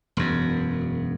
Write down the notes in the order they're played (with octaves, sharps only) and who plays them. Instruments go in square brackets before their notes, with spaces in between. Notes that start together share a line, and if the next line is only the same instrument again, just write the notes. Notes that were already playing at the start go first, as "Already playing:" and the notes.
[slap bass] E1 F#2